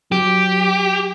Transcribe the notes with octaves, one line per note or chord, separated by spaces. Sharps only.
F#3 G4